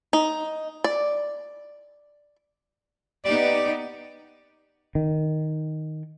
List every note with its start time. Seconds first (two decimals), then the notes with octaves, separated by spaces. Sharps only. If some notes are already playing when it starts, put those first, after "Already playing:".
0.13 D#4
0.84 D5
3.25 B3 D#4 G4 D5
4.95 D#3